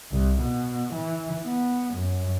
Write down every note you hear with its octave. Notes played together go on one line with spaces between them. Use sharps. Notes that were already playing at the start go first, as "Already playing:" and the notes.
C2
B2
E3
B3
F#2